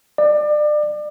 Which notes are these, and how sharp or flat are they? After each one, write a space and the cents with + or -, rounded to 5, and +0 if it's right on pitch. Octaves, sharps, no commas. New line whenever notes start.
D5 +30